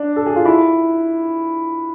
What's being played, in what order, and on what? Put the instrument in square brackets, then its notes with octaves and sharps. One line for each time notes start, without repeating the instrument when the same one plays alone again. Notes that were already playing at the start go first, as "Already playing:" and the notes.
Already playing: [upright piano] D4
A4
G#4
F4
E4